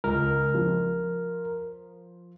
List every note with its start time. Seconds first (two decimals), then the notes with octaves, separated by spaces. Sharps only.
0.04 C#2 A#4
0.54 F3